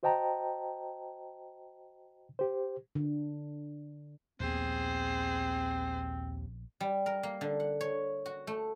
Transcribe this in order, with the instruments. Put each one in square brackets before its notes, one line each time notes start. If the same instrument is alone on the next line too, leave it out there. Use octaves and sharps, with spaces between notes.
[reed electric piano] F#4 C5 D#5 G5 A5 A#5
G4 C5
[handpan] D3
[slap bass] A#1 B3 [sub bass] D#2 [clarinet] C4 [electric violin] G#4 C5
[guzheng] G3
A#4
A#3
D3
F#5
C#5
F#4
A3